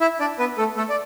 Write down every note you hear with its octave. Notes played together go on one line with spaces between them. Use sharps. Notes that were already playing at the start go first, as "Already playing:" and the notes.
E4 E5
D4 D5
B3 B4
A3 A4
A3 A4
D5